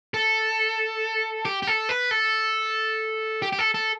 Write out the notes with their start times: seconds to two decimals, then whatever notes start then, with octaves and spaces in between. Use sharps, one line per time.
0.14 A4
1.45 G4
1.62 G4
1.67 A4
1.89 B4
2.11 A4
3.42 G4
3.52 G4
3.59 A4
3.74 A4